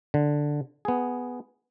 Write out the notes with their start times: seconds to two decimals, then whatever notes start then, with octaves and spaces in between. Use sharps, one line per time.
0.14 D3
0.85 B3 G#4